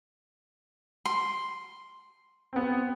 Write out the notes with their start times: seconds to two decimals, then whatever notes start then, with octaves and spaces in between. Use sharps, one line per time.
1.06 C6
2.53 B3 C4